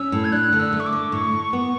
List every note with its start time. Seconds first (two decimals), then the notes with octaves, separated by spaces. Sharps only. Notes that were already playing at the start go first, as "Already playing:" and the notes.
Already playing: C#4 E6
0.12 A2
0.25 G#6
0.32 D4 F#6
0.52 D3
0.60 E6
0.73 A3
0.80 C#6
0.86 D6
0.93 D3
1.12 A2 C#6
1.33 A2
1.53 B3